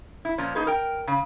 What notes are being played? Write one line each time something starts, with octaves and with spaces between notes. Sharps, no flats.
E4
A#2 F3 C#4
A#3 D#4 G#4 B4
A#4 G5
C#3